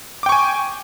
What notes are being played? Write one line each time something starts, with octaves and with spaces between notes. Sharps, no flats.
G5 G#5 C#6 D6